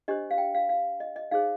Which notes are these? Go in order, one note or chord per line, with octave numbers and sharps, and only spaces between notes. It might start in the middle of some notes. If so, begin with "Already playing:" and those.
D4 G4 C5 D#5
F5
G5
F5
F5
D#5
D#5
D#4 G#4 C5 F5